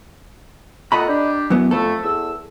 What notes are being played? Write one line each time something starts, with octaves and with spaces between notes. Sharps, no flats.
A#2 A4 D#5 F#5 A#5 B5
D4 G4
F#2 E3 B3
F2 A3 A4
E2 E6